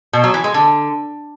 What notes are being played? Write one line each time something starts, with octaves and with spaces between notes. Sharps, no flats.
B2
F#3
E3
G#3
D3